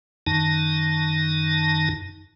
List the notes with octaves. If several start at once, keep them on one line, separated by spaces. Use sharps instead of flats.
F#2 D#3 D#4 A5